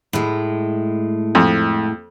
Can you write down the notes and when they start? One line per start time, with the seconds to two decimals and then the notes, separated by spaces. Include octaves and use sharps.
0.13 A2 G#3
1.35 F2